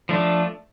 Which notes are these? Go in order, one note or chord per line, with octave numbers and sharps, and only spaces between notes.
F3 A3 D4